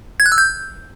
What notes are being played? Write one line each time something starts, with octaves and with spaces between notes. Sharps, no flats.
G#6
F#6
E6
G6